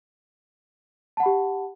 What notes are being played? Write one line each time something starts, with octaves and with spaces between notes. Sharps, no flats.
G4 F#5 A5 B5